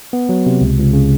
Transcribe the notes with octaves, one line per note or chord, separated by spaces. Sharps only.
B3
F#3
C3
C#2
C#2
C#3